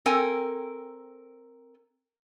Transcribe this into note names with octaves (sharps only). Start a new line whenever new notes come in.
C4 A4 A#4 G5 G#5